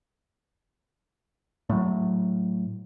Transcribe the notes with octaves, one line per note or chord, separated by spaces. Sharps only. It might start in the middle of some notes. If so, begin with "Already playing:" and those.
A2 F#3